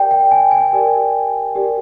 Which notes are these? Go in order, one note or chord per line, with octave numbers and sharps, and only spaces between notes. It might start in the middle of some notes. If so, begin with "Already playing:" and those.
Already playing: G4 A#4 D5 G5
G5
G#5
G#5
G4 A#4 D5
G4 A#4 D5